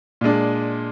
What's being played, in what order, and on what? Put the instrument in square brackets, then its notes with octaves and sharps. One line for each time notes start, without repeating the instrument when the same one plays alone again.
[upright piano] A#2 G#3 D4